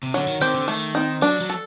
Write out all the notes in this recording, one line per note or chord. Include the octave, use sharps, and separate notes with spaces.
C3
D3 F#3
D#3
D#3 C4 G4
D3
D#3 A3
C4 D#4
F#3 D4
F#3
A4